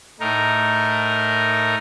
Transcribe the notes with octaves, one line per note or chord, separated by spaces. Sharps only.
A2 D#4 A#4